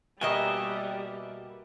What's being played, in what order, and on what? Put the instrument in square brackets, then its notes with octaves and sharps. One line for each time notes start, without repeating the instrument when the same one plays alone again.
[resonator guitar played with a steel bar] B2 A#3 D#5 [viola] G3 [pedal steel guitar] E5 G5 G#5